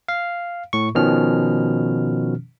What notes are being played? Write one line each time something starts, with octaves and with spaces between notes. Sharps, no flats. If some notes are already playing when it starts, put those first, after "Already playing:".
F5
A2 C#6
B2 D#3 F3 C#4 F6